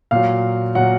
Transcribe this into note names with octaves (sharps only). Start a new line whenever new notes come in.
A#2 F#3 F5
A#2 F#3 F#5